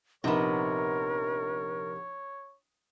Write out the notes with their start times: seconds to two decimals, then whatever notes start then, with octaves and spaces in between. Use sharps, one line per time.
0.24 A#1 C3 B3 D#4 A#4 C#5